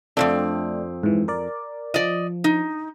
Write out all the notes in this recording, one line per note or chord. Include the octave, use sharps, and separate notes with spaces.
F2 A#2 A3 C4 D4
G#2 E3
A#4 D5
F3 D5 D#5
D#4